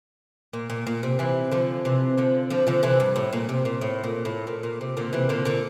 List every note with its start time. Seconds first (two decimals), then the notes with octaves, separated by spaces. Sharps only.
0.53 A#2
0.70 A#2
0.87 A#2
1.03 C3
1.19 C3 E3
1.51 D3 F3
1.85 C3 E3
2.18 D3 F3
2.50 D3 F3
2.67 D3 F3
2.83 C3 E3
3.00 G2
3.16 A2
3.33 A#2
3.49 C3
3.65 A#2
3.81 A2
4.04 A#2
4.25 A2
4.47 A#2
4.63 A#2
4.81 C3
4.97 A#2 D3
5.13 C3 E3
5.29 A#2 D3
5.45 A#2 D3